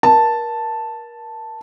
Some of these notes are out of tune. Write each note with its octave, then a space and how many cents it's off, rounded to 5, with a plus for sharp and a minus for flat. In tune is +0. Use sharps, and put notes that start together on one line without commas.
A#4 +30 A5 +0